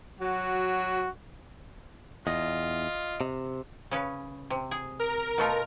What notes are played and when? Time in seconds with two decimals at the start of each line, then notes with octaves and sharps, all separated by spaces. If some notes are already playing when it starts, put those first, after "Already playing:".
0.20 F#3 F#4
2.27 E2 F4 D#5
3.21 C3
3.91 C#3 C#4 B4
4.50 C3
4.71 G#4
5.00 A#4
5.38 B2 A3 F4